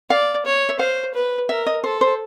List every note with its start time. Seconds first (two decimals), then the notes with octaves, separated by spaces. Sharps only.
0.10 D5 F5
0.45 C#5
0.69 E5
0.79 C5 F5
1.14 B4
1.49 A#4 E5
1.67 D#5
1.84 A4 C5
2.01 C5